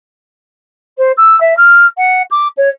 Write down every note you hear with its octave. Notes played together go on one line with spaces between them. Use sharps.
C5
E6
E5
F6
F#5
D6
C#5